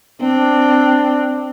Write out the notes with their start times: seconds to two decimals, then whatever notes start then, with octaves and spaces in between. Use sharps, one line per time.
0.21 C4 D4